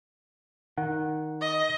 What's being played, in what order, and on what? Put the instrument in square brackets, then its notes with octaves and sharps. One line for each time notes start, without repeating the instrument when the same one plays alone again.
[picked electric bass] D#3 [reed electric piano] F#5
[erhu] D#5